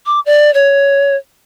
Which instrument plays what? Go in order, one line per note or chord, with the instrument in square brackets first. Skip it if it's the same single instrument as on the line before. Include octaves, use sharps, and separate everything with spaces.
[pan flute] D6
D5
C#5